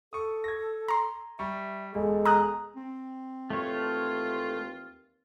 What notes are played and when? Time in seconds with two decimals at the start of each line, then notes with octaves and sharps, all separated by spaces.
0.13 A4 C#6 D#6
0.44 G#6 A#6
0.88 A#5 C6
1.39 G3 E5 C#6
1.95 E1 G#3 A4
2.25 A#5 D#6 F#6
2.76 C4
3.50 D#2 E3 A3 F4 C#5